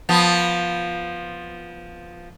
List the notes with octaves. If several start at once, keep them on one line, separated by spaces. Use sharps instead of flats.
F3 B3